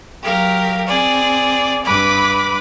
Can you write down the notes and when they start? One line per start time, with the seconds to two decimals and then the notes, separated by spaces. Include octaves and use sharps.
0.23 F#3 G4 A#4 F5
0.86 C4 G#4 D5
1.84 G2 B4 B5 D6